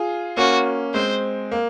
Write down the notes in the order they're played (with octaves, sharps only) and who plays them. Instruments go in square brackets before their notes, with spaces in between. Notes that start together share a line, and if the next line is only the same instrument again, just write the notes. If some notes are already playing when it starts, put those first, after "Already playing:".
Already playing: [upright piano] F4 G#4
[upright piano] A#3 C#4 [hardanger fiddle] F#4
[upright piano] G#3 C4 [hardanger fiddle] C5
[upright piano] A#3